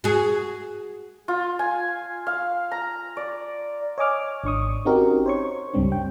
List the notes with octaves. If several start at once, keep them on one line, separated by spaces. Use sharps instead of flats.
F#4 G#4
F4
G#5
F5
A#5
D5
C#5 D#5 G#5 D6 F6
G#1 D4 C#6 D#6
C4 C#4 D#4 F#4 G4 A#4
C5 C#5 C#6
C#2 G2 G3 C4 D4
G5